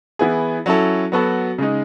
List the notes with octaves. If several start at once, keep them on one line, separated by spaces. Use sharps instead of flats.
E3 B3 E4 G#4
F#3 C#4 E4 A4
F#3 B3 F#4 A4
C#3 G#3 D#4